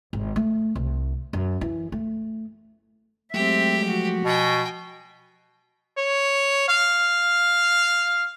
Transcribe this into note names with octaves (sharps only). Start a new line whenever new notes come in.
G#1
A3
C2
F#2
E3
A3
F#3 G#3 A3 C4 G4 E5
F3 F#4
B2 G5 G#5
C#5
F5